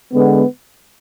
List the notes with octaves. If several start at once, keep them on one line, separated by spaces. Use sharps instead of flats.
D3 G#3 B3